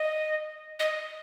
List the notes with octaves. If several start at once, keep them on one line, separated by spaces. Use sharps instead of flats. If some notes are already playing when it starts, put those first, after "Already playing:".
Already playing: D#5
D#5